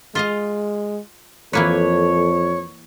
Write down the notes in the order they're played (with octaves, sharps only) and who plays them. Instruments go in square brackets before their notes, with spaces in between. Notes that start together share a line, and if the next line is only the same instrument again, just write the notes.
[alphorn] G#3 [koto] F4 D#5 F5
[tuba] F2 [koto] E3 A#3 B4 [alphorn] A4 [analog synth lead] C#5